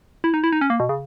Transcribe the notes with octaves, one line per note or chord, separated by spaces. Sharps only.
E4
D#4
E4
D#4
C#4
A#3
B2
C#3